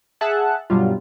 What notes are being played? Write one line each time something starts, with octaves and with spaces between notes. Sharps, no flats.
G#4 E5 F#5 A5 F#6
G2 B2 F#3 G3 F4